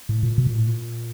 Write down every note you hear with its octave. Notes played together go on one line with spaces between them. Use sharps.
A2
A#2
B2
A#2
A2
A#2